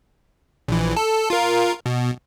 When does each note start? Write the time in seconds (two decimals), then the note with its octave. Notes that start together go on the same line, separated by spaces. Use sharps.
0.68 A#1 E3
0.97 A4
1.30 F4 A#4
1.86 B2